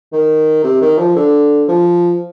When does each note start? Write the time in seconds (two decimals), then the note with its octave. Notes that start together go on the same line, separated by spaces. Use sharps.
0.13 D#3
0.64 C3
0.81 D#3
0.98 F3
1.16 D3
1.68 F3